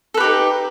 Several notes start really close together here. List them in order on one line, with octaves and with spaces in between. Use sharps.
A4 B4 G4 D#4